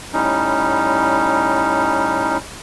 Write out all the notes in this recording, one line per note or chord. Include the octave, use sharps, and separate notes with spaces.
A2 G3 C#4 D#4